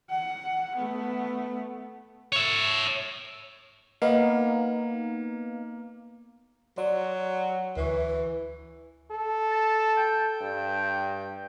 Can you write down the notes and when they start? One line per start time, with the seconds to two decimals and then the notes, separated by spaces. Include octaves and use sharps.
0.10 F#5
0.76 A3 B3
2.33 C#5 E5
4.02 A#3 B3 D#4 F5
6.78 F#3 D5 C6
7.76 D2 E3 C#6
9.11 A4
9.51 A5
9.97 G5
10.42 G2